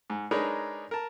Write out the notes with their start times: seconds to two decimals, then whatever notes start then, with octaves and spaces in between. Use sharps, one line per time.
0.10 G#2
0.31 G#3 D4 D#4 A#4 B4 C#5
0.91 A#4 A5